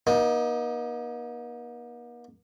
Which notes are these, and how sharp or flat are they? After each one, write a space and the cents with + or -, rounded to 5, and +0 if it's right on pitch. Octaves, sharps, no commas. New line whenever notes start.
A#3 +45 D#4 +10